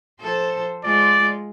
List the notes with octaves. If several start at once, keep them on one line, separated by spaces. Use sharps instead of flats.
F3 A4 C5
G#3 F4 D5